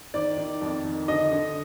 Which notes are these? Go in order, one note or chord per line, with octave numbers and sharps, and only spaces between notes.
D#3 D5
D#3
F2
D#3
D3 D#5
D3